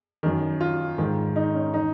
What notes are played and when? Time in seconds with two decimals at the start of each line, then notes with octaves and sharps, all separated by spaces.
0.23 F#2 D#3
0.61 F4
0.98 G#2 D#3
1.36 D#4
1.54 C#4
1.74 D#3 D#4